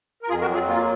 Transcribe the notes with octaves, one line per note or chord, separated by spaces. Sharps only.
A#4
F2 F4 G#4
F#4 A#4
F#3
F4 G#4
A#3 F4